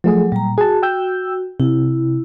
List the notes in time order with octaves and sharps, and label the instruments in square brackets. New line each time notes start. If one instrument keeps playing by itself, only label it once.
[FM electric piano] F3 A3 G#4 [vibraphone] F#3
[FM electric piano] A#2 [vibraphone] G3 A#5
[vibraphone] F#4 [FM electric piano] G#4 A5
[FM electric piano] G5 E6 G6
[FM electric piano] C3 [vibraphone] E4